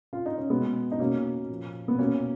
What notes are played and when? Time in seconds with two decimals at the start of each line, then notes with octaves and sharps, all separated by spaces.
0.13 F4
0.26 D#4
0.38 C#4
0.50 B2 G#3 B3
0.92 D#4
1.00 B2 A#3 C#4
1.49 A#2 F3
1.88 B3
1.99 B2 A#3 C#4